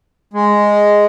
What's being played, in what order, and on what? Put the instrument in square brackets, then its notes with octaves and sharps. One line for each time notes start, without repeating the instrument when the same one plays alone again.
[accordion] G#3